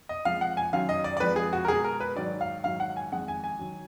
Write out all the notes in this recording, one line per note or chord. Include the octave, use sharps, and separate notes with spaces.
D#5
F2 F3 G#3 F5
F#5
G#5
F#2 D#3 F#3 F5
D#5
D5
D5
F2 F3 G#3 B4
G#4
F#4
A#4
B2 G#3 G#4
A#4
B4
G#2 D#3 F#3 D5
F5
G#2 D#3 F#3 F5
F#5
G#5
F2 D#3 G#3 F#5
G#5
G#5
D#3 F#3